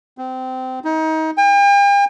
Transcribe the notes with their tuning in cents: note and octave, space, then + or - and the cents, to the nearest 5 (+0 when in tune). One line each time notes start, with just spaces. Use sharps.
C4 -20
D#4 +30
G5 +45